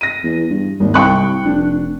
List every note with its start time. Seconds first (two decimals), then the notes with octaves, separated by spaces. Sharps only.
0.01 A#6 D#7
0.23 E2
0.50 G2
0.80 G#1 D#2
0.94 C2 G5 C#6 F#6
1.46 F1 D4